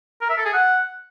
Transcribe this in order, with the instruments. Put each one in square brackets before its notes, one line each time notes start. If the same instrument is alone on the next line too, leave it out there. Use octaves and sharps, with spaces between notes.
[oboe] A#4
E5
A4
G#4
F#5